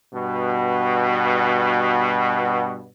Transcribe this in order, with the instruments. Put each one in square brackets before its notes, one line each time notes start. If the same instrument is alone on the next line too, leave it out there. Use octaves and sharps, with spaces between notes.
[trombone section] G2 B2